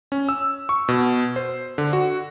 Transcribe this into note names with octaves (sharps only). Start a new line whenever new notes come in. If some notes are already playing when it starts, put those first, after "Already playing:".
C#4
E6
C#6
B2
C5
D3
F#4